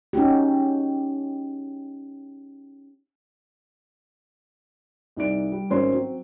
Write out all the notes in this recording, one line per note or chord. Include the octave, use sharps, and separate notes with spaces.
C#4 D#4 F#4 G4
C2 D#4 D5 D7
G3
G#1 C#4 A#4 C5 C#5 C6
F#3 C4